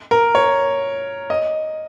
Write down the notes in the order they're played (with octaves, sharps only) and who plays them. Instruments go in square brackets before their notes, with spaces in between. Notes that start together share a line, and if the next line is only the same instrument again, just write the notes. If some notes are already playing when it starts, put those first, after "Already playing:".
[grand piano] A#4
C#5
D#5